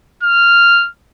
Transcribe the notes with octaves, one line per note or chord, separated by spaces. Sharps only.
F6